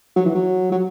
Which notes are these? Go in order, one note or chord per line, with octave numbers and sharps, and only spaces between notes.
F#3
E3
F#3
F#3